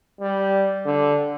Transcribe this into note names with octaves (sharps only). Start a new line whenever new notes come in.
G3
D3